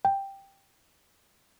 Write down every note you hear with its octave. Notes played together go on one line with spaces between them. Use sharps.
G5